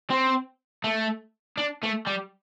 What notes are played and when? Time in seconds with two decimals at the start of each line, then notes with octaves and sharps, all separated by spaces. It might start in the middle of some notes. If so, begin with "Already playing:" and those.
0.11 C4
0.84 A3
1.58 D4
1.83 A3
2.07 G3